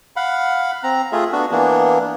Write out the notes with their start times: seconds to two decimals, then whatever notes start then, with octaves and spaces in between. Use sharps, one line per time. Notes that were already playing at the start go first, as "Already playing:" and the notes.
0.16 F5 F#5 B5
0.84 C4 A#5
1.12 A3 F4 G#4 E5
1.32 B3 D4 F#4
1.51 E3 A#3 B3 D4